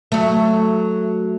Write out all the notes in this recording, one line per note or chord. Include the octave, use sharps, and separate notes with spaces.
F#3 A3